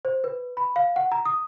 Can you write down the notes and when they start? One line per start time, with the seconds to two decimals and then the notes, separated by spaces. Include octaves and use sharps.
0.05 C5
0.24 B4
0.57 B5
0.76 F5
0.96 F#5
1.12 A#5
1.25 D#6